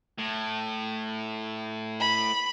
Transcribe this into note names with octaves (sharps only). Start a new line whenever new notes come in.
A2
B5